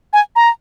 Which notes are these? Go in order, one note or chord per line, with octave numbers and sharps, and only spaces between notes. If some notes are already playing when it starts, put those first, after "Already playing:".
G#5
A#5